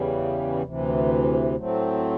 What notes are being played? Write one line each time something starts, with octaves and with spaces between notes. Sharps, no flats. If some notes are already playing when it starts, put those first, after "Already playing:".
Already playing: E2 C#3 E3 G3
D2 C3 E3
A2 F#3 A3 C4